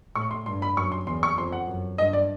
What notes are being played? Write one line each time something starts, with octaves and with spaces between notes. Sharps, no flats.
A2 C#6
C6
G2 C6
B5
F#2 C#6
C6
E2 C6
C#6
F2 C6
F#5
F#2
G2 D#5
D5